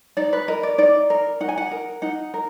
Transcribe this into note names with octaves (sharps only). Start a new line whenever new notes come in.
D#4 D5
B4
A#4 D#5
D5
D#4 D5
A#4
D#4 F#5
G#5
F#5
A#4
D#4 F#5
A#4